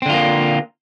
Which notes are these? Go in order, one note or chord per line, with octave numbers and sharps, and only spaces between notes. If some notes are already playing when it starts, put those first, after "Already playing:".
D3 A#3 C4 F4